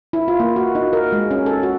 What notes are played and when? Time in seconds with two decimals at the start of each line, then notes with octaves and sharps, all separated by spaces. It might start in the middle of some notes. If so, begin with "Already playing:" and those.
0.13 E4
0.28 F4
0.40 A#3
0.56 F#4
0.75 D#4
0.93 A#4
1.12 G#3
1.31 C#4
1.46 A4
1.63 F#4